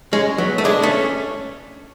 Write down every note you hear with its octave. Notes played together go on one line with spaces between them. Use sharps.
G#3 C#4
F#3 B3
A3
G#3 D4
A3
C#4